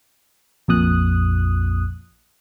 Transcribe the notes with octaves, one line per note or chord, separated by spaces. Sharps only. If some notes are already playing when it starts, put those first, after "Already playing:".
A#1 F2 A#2 D#6 F#6